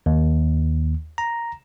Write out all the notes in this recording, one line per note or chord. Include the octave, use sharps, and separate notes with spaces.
D#2
A#5